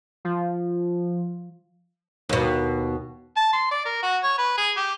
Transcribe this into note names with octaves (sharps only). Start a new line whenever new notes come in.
F3
D#2 B2
A5
C6
D5
A#4
F#4
C#5
B4
G#4
G4